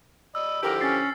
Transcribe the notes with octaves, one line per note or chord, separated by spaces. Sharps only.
D5 D#5 B5 E6
D3 E3 F3 G4 A4 A#4 C5
C#4 A6 C7